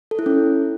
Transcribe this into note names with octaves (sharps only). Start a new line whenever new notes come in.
A4
E4
C#4